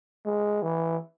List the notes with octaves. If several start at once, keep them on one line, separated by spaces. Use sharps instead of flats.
G#3
E3